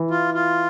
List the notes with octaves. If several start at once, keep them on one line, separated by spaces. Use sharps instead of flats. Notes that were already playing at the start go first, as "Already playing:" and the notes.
Already playing: E3
F4
F4